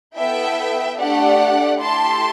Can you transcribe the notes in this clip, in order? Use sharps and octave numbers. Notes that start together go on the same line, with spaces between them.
B3 E4 A4 E5 G5
A3 D4 G4 D5 F#5
A3 E4 G4 A5 C6